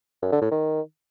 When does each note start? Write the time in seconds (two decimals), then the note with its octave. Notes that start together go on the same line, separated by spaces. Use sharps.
0.22 F#2
0.32 D3
0.42 A2
0.51 D#3